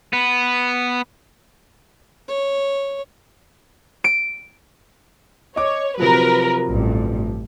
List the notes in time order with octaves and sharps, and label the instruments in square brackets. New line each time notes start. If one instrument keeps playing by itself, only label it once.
[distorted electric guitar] B3
[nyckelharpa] C#5
[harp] D7
[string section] C#5 [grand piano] D#5 D6
[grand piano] C3 F3 F#3 [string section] A#4 B4
[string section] A1 G2